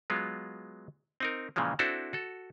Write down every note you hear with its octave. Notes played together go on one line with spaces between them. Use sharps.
F#3 G#3 B3 F4
C4 D#4 A#4
A#2 C#3 E3 F3 G#3
C4 D4 E4 F#4 A4 C5
F#4 A4